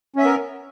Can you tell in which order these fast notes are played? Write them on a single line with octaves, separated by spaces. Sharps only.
C#4 E5 B3 A#4